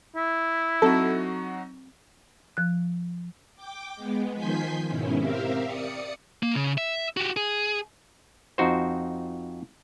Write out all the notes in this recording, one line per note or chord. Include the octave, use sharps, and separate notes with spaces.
E4
F#3 C4 D#4 F#4 A4 A5
F3 F#6
G5 D6
G#3 B3
D#3 F3 G#5 C6 G6 B6
G#2 B2 D#3 C#4 E4
C4 G4 A#4 E5 F5
D5 D#6 C#7
A#3
C#3
E5
F#4 G4
G#4
F2 D#4 F#4 C5